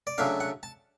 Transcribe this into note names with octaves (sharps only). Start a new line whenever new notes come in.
D5
C#3 F#3 A3 D4 F5
F#5
A5